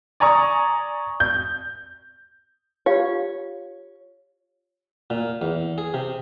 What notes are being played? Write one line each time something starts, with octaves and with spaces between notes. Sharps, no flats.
D5 G#5 A#5 C#6 D#6
G6
F4 G4 C#5 F5
A#2
E2
G#4
C3